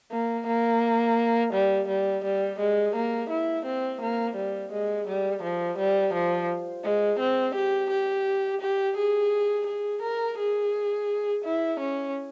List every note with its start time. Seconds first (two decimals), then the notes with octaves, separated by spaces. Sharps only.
0.12 A#3
0.47 A#3
1.54 G3
1.88 G3
2.24 G3
2.60 G#3
2.96 A#3
3.31 E4
3.66 C4
4.02 A#3
4.36 G3
4.72 G#3
5.08 G3
5.43 F3
5.78 G3
6.14 F3
6.84 G#3
7.20 C4
7.55 G4
7.90 G4
8.62 G4
8.98 G#4
9.67 G#4
10.02 A#4
10.39 G#4
11.45 E4
11.80 C#4